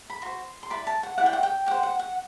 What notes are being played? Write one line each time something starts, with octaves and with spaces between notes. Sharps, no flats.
B5
F#4 C5 C6
C6
E4 B4 D5 B5
A5
F#5
E4 G4 D5 F#5
G5
F#5
G5
G4 C5 F#5
F#5
F#5